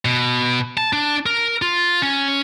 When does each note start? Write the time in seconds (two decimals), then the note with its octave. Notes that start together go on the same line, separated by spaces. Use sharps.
0.05 B2
0.77 A5
0.93 D4
1.26 A#4
1.62 F4
2.02 C#4